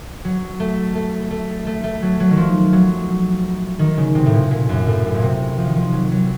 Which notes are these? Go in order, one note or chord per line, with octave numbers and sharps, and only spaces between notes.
F#3
A3
A3
A3
A3
A3
F#3
F#3
D#3
F3
F#3
D#3
C#3
C3
A2
A#2
A#2
F#2
A2
A2
A#2
C3
F3
D#3
F3
F#3
F#3